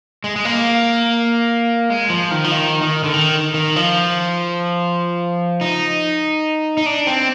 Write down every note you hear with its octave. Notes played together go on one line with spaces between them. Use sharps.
G#3
G#3
A#3
G#3
F3
D#3
F3
D#3
D#3
D3
D#3
D#3
F3
D#4
D#4
D4
C4